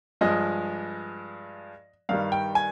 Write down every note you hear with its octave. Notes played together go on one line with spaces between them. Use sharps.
G2 F3 G#3 D#5
G2 D#3 G3 F5
G5
G#5